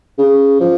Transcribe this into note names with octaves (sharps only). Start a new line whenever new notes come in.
C#3
F3